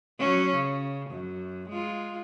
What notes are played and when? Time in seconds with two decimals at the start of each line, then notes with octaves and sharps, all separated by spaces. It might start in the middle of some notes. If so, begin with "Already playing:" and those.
0.19 F#3 C#4
0.54 C#3
1.10 F#2
1.69 G#3 F4